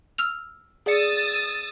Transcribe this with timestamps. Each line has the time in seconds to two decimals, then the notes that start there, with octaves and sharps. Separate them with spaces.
0.18 E6 F6 F7
0.86 G#4 D5 D#6 E6 A6 C#7